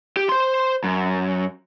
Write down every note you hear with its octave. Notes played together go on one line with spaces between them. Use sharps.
G4
C5 C6
F#2